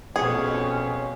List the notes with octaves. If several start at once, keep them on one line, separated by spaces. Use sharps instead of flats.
F2 B2 C#4 G#4